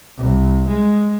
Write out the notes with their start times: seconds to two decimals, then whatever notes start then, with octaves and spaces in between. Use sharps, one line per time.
0.17 C2
0.68 G#3